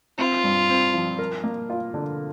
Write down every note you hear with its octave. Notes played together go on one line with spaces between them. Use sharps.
C4 F4
G2
C4
F3
A#4
A#3
F4
D3